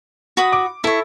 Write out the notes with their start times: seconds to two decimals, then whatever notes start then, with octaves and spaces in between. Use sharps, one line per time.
0.37 F#4 B5 D#6
0.52 D6
0.84 E4 A4 C#5 E5